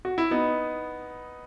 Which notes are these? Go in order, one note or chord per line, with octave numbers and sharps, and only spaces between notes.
F#4
E4
B3 D#4